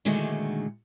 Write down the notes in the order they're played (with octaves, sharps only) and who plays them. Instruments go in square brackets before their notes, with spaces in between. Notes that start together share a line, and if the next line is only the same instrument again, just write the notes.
[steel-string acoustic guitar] A#2 D3 D#3 F#3 G#3 A3